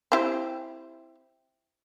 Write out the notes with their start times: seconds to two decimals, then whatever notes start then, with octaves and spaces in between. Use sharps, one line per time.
0.12 C4 E4 G4